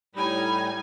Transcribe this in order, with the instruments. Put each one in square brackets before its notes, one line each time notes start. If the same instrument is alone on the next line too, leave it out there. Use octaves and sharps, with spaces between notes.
[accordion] A2 G3 [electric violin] D#4 G#5 [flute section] B5